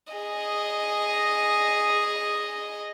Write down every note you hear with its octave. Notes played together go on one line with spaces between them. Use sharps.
G#4 D#5